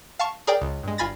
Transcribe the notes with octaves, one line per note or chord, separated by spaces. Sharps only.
F5 A5 C#6
G#4 A#4 D5 G5
C#2
G2 G#3
G1 F4 G#5 B5 A6 A#6